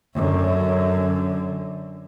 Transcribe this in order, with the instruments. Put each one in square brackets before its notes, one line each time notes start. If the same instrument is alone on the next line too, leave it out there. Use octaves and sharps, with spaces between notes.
[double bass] F#2 D3